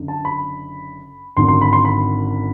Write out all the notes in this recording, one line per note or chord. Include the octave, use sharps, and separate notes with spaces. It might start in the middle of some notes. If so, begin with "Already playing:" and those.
Already playing: F#1 D3
A5
B5
G#1 F#2 D3 C6
C6
B5
C6
B5